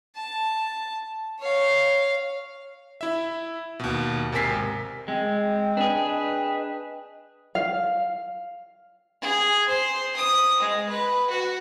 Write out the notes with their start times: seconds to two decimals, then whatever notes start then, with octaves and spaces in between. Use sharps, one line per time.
0.16 A5
1.40 C#5 F5
3.01 E4 E5
3.80 D#2 B2
4.32 G#1 C3 A#4 G#5 B6 C7
5.08 G#3 C4 D#5 G5
5.77 D4 G#4 B4
7.55 F5
9.22 G#4
9.68 C5
10.16 D#6
10.60 G#3
10.89 B4
11.30 F#4